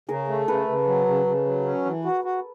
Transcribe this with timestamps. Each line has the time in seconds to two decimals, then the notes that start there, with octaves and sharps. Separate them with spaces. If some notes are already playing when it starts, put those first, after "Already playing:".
0.09 C#3 G#4 A#4
0.28 A3
0.47 C#3 A4 B4
0.68 C#3
0.87 F#3
1.07 C#3
1.26 C#3
1.45 F#3
1.65 C#4
1.85 E3
2.05 F#4
2.24 F#4